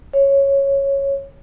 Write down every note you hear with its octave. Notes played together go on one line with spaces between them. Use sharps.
C#5